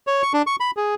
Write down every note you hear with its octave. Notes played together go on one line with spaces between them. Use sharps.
C#5
C#6
D4
C#6
B5
G#4